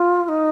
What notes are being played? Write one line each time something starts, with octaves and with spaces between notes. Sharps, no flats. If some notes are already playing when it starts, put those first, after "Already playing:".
Already playing: F4
F4
D#4